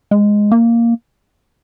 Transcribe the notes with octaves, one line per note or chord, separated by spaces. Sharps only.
G#3
A#3